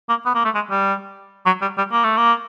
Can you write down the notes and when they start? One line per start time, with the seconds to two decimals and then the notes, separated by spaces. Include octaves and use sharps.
0.09 A#3
0.26 B3
0.35 A#3
0.45 A3
0.55 G#3
0.70 G3
1.46 F#3
1.62 G3
1.78 G3
1.92 A#3
2.04 A3
2.17 A#3